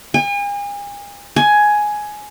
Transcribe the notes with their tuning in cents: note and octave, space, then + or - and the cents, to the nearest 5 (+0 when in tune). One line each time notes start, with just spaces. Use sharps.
G#5 -40
G#5 +10